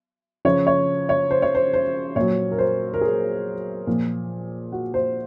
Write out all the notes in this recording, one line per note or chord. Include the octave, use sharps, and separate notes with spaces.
C#3 F3 C#5
C#5
C#5
C5
C#5
C5
C5
A#2 F#3 C#5
A#4
C5
A#4
G#4
A#2 F3
F#4
C5